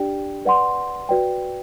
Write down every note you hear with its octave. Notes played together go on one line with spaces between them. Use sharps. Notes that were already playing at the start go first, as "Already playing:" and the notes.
Already playing: D4 G4 D5 G5
B4 D5 F#5 C6
F#4 B4 D5 G5